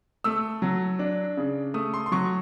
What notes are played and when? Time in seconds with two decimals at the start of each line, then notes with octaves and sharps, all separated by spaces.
0.24 A3 E6
0.62 F#3
0.99 D4
1.37 C#3
1.74 A3 D#6
1.94 C6
2.06 C6
2.12 F#3 C#6